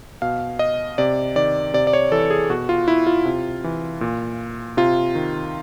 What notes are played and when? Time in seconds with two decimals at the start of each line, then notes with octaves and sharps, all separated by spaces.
0.22 B2 F5
0.59 D#5
0.98 C3 D5
1.36 D#3 D5
1.74 C3 D5
1.87 D5
1.93 C#5
2.11 E3 A4
2.30 G#4
2.50 B2 F#4
2.69 F4
2.88 E4
3.07 F4
3.25 C3
3.64 E3
4.01 A#2
4.77 C3 F4
5.15 D#3